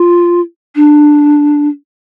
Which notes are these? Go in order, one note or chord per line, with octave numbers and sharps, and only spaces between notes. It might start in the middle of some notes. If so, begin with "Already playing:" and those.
Already playing: F4
D4